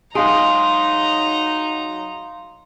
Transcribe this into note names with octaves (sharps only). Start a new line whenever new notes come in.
F#3 G#3 D#4 G#4 F5 A#5 C6 D7